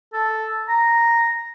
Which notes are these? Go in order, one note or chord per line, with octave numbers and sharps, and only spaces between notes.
A4
A#5